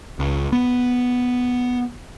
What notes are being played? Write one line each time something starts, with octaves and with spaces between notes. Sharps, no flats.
C#2
B3